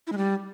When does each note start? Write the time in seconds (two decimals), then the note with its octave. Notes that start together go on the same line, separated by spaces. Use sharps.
0.07 E4
0.12 G#3
0.17 G3